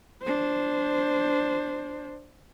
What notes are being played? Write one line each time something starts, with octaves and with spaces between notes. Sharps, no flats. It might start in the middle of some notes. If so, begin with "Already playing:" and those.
D4 C5